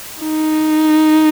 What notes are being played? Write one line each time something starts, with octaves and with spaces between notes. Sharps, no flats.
D#4